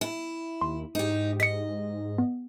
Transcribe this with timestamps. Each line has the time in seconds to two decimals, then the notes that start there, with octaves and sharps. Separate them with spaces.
0.01 E4
0.61 D#2 C6
0.95 G#2 D#4 G4
1.40 D#5 B6 C#7
2.18 B3